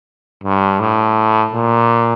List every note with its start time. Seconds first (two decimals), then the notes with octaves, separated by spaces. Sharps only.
0.44 G2
0.80 A2
1.53 A#2